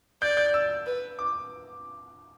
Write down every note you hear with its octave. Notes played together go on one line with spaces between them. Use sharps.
D5 G6
G6
E6
B4
D6